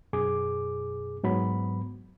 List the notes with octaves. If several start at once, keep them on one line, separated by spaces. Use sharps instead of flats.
F#2 B2 G#4 D6
G#2 F#3 B3 B5